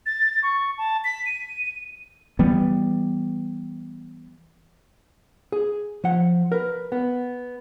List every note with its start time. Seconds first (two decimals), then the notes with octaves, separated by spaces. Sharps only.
0.06 A6
0.43 C#6
0.78 A5
1.04 B6
1.26 D#7
2.39 E3 G3 B3
5.52 G#4
6.04 F3 F#5
6.52 A#4 B4
6.92 B3